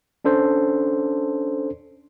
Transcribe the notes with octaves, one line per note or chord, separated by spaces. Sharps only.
C#4 D4 A4 C5